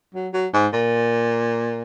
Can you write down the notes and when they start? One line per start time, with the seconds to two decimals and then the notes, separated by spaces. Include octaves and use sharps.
0.15 F#3
0.34 F#3
0.54 G#2
0.73 A#2